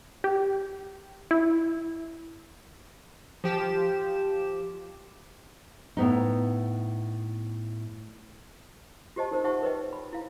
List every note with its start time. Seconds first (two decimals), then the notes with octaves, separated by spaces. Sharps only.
0.24 G4
1.31 E4
3.44 F3 G4 E7
5.97 A2 B3 D#4
9.16 F4 G4 C5 D#5 A5
9.31 D#4 A#4 C5 D#5
9.44 D#4 C5 E5 F#5 A5 C#6
9.62 A#4 B4 C#5 D#5 G5
9.93 B5
10.13 E4 F5